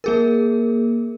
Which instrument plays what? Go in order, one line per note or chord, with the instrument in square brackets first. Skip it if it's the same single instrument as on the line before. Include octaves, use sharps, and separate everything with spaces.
[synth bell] A#3 G#4 A#4